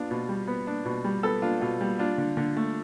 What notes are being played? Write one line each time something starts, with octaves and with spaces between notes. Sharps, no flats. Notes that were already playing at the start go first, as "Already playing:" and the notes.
Already playing: B3 D4 F4
B2
G3
B3
D4
B2
G3
B3 A4
D4 F4
B2 F4
G3
D4 F4
D3
D3
A3